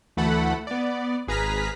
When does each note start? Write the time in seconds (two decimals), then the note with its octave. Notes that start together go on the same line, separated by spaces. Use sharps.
0.17 D2 E3 A3 A4 F#5 B5
0.67 B3 D5
1.28 G#1 G#4 B4 A#5 F6 B6